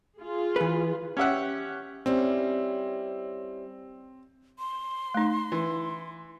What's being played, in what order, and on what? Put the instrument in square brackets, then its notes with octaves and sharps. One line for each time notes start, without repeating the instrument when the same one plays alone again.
[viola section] F4 G#4
[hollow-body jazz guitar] E3 B4
[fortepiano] C#4 G4 E5 F#5
[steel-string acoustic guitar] G3 C#4 E4 [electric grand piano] C4
[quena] C6
[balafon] A3 D#4
[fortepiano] E3